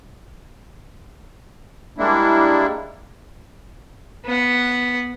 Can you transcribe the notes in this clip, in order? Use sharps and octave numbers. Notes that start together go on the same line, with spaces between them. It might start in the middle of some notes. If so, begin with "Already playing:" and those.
G3 G#3 A#3 D4 E4
B3 F#5